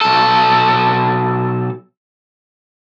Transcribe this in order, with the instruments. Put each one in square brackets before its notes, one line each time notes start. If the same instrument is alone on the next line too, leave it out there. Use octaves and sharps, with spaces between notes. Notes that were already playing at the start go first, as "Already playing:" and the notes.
[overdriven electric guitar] B1 A4